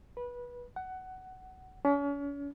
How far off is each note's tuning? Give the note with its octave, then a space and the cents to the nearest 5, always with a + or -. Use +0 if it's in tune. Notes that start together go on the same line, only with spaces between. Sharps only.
B4 -20
F#5 +15
C#4 +40